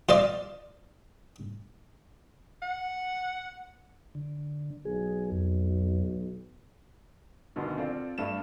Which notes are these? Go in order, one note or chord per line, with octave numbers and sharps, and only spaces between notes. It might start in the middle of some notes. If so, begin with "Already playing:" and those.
F4 C5 D5 D#5
F#5
D3
B1 G#4
F2
D2 B2 D3 D#3
C4 F4 A4 D5
G2 A3 D4 E7